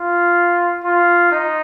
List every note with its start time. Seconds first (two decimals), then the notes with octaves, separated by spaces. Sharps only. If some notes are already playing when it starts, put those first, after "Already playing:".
Already playing: F4
0.84 F4
1.32 D#4